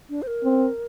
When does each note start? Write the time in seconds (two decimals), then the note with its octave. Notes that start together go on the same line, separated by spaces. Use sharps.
0.10 D4
0.22 C5
0.27 A#4
0.44 C4